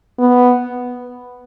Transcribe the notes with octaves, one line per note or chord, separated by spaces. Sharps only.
B3